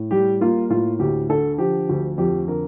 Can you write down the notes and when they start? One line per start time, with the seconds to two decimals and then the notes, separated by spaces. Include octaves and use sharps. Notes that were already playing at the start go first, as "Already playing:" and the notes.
Already playing: A2
0.11 G3 G4
0.41 A#3 F4
0.70 A2 F4
0.99 D2 G4
1.29 D3 A4
1.58 F3 G4
1.89 D2
2.18 F2 G4
2.48 D3 A#4